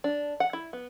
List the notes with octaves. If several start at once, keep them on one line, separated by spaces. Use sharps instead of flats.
D4
F#5
E4
B3